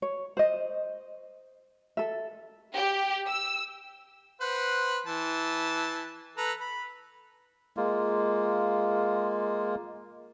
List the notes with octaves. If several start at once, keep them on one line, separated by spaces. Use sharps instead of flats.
C#5
C5 D#5
A4 E5
G4
E6
B4 C5 F#5
E3 A5
A4 B4 A#5
B5
G#3 A#3 F4